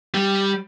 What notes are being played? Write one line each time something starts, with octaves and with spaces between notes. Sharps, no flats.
G3